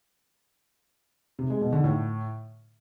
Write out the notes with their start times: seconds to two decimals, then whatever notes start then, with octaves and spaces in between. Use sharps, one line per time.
1.39 C3
1.50 G#3
1.61 B2
1.73 D3
1.84 A2